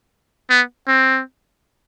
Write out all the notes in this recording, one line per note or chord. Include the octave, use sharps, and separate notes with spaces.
B3
C4